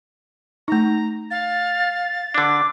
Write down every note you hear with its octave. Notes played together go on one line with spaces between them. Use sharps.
A3 D#4 A#5
F5 A6
D3 D4 D6